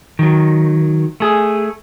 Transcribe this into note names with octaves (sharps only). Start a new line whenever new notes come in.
D#3 F#3
A3 G#4